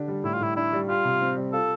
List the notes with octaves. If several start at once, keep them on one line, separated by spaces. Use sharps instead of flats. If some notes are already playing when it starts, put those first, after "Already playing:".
Already playing: D3 D4 G4
G3
A2 E4
F4
A2 E4
D4 E4
G3
F4 G4
C3
C4
G3
F4 A4